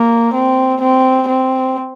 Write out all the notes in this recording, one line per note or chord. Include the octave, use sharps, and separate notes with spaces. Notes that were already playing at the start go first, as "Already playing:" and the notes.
Already playing: A#3
C4
C4
C4